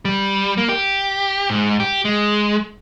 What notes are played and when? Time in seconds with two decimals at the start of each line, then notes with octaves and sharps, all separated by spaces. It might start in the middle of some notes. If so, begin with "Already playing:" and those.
0.05 G3
0.57 A#3
0.69 G4
1.50 G#2
1.80 G4
2.05 G#3